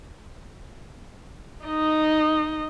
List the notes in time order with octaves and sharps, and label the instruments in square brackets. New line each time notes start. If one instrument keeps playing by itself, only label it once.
[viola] D#4 D#5